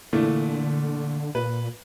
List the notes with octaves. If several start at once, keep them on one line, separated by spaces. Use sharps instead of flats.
A#2 D3 E3 A3
A#2 B4